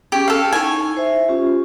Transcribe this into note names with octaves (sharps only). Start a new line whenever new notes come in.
C#4 G4 G#4
A4 F5
D#4 E4 C#5 G#5
C5 E5
C#4 F4 G4